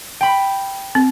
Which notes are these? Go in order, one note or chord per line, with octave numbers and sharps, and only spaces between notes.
G5 B5
C4